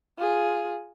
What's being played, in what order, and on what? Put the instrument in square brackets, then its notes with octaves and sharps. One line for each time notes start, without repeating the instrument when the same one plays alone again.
[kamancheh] F4 G#4